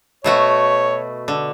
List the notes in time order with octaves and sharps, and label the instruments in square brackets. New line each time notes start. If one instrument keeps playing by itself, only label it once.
[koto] B2 A3 F#4 [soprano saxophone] C#5
[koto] D3